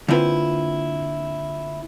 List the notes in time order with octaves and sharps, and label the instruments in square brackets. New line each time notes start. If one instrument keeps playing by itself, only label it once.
[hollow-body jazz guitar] D3 A#3 C4 E4 F4 B4